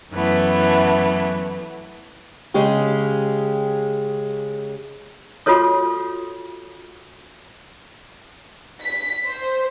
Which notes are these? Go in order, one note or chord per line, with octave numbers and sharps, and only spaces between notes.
F#2 E3 A3 B3
C#3 G#3 C#4 G4
F4 F#4 A4 C#5 D#6
B6
C5